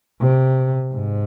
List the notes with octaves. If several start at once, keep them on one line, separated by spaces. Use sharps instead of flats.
C3
G#2